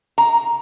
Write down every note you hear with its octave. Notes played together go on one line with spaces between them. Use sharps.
A#5